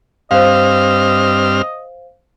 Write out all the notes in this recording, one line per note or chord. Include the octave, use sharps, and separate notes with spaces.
G2 C4 C5 D#5 F5 F6